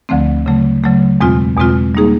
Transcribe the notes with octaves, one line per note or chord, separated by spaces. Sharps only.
D2 D3 F3 A3 C4
C#3 F#3 A3
C#3 F#3 A3
E2 B2 G#3 C4 F4
E2 B2 G#3 C4 F4
G3 A#3 D#4 G#4